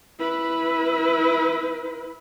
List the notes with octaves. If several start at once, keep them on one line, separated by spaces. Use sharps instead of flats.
E4 B4